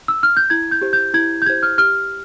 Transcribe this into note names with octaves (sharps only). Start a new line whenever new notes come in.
E6
F6
G6
E4 G#6
G6
G4 C5
G6
E4 G#6
G6
G4 C5 G#6
F6
G4 F6